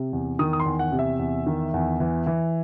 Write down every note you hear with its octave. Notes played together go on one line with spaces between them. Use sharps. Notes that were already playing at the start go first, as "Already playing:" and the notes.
Already playing: C3
E2
D#3 D#6
D#6
C6
E2
F#5
C3
E5
E2
D#3
E2
E3
E3